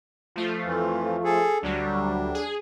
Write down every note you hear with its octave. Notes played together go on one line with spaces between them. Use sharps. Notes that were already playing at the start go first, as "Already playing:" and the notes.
F3 A3 F4
F2 E3
G#4 A4
D2 F#3 G3 D4
G#4